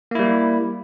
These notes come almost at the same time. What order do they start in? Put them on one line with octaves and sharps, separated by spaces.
A#3 E4 G3